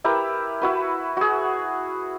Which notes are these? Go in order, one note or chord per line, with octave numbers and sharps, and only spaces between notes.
E4 G4 A#4 B4
E4 F#4 B4
F#4 G#4